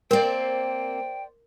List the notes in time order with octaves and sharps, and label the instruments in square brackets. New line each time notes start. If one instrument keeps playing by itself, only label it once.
[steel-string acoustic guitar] A#3 C4 [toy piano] A#4 [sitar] C5 D5 [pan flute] G5